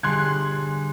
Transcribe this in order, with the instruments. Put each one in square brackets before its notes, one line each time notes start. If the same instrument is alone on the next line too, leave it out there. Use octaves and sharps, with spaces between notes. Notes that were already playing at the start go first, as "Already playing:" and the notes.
[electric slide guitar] D3 G3 G#4 [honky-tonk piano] C6 F#6 G#6